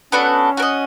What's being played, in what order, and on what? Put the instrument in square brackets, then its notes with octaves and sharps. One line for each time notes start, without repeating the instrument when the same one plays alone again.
[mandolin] B3 D4 F#4 A4 [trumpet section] C#4
[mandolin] F#4 A#4
D#5